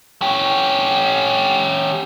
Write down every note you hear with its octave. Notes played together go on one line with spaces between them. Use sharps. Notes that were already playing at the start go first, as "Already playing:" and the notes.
C#4 G4